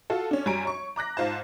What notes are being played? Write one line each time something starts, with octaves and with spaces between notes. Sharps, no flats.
F4 F#4 A4
C#4 D4
F#2 G3 C#5 G#5 A#5 D7
C#5 C#6
A#5 D6 F#6 A#6
G#2 F4 C5 A5